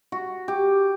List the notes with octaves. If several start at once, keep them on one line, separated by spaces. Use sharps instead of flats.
F#4
G4